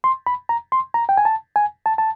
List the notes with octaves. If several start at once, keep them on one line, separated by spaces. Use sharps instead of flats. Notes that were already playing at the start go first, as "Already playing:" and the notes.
C6
B5
A#5
C6
A#5
G5
G#5
A5
G#5
A5
A5